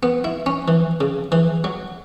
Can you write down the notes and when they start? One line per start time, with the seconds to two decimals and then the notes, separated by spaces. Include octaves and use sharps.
0.03 B3
0.24 E4
0.46 C#4
0.68 E3
1.01 C#3
1.32 E3
1.64 F#3